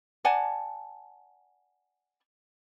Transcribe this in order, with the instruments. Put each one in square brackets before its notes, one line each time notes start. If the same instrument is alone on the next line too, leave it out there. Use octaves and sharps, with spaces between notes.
[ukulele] D5 F#5 G#5 A5